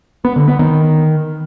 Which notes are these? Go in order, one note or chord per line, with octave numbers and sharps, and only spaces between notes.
B3
D3
B3
D#3